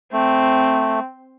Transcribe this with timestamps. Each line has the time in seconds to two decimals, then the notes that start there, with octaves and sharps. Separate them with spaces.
0.13 A3 C4